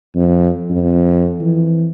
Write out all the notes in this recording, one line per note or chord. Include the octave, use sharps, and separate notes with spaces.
F2
F2
E3